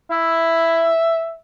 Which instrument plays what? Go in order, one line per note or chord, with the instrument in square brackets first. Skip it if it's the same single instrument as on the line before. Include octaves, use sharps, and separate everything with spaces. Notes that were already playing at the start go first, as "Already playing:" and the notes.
[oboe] E4 [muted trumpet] E5